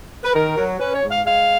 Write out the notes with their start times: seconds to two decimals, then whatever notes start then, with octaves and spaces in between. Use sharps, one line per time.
0.24 B4
0.34 D#3 A#4
0.57 F#3
0.80 C#4 B4
0.94 C#5
1.02 G#2
1.10 F5
1.25 G#3 F5